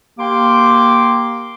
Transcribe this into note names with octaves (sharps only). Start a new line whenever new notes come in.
A#3 G4 G5 C6 D6